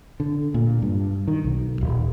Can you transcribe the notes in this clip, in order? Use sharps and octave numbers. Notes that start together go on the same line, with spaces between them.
D3
A#2
G2
D#3
B1
D#1